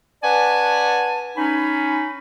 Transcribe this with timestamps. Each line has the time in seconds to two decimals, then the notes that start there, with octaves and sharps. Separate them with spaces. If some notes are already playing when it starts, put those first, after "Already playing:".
0.23 C#4 B4 D5 F#5 G#5 A5
1.37 C#4 D#4 B5